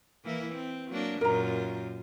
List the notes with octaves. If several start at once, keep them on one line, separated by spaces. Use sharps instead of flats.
E3 A#3 E4
C4
F#3 A#3 D4
F#2 A#2 F4 A#4 A#5